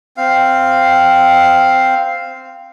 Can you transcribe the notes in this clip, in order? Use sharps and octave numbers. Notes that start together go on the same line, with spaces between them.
C4 F5